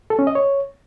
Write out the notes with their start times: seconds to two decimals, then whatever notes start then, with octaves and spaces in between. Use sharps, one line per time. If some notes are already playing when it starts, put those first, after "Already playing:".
0.10 A4
0.19 C#4
0.27 D#5
0.35 C#5